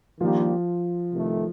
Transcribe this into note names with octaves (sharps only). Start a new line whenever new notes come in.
D#3 F3 G3 A#3 D4 G4
C2 C3 D#3 A3